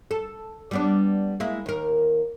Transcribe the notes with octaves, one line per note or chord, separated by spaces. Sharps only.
A4
G3 B3 D4
G#3 A#3 E4
D#2 A#4